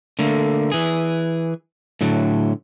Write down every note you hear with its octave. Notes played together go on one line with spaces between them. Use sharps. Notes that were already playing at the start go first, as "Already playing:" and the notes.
D3 A3 A#3
E3 G#4
A2 D3 F#3